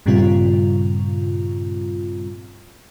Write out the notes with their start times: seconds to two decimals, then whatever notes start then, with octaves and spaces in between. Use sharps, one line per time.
0.06 G2 A#2 C#3 G3 C4 F4